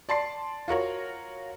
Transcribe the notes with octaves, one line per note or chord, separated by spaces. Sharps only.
D5 A5 C6 C7
F4 F#4 A#4 C#5